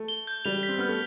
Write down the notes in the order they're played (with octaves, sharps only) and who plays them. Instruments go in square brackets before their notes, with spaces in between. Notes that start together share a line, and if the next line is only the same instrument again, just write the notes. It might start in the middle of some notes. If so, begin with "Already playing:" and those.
Already playing: [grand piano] A3
[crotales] G7
G6
[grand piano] G3 [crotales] F7
[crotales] B6
[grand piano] C4
[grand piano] B3 [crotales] F6
[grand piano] A3